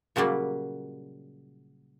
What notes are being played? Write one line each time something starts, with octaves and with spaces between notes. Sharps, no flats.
A#2 C#3 F#3 G3 A#3